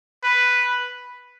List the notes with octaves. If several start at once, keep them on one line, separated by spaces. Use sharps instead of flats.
B4